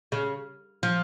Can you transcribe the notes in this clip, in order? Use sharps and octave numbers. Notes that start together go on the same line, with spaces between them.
C#3
F3